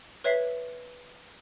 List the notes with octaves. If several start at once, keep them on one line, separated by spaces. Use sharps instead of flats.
B4 C#5 E5 B6 C7